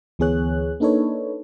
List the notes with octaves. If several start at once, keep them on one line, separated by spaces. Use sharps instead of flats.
D2 E3 B3 G#4 C#5 F#6
A#3 D4 D#4 A4 B4 C#5